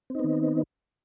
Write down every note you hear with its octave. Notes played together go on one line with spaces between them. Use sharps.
D#3 B3 C4 D#4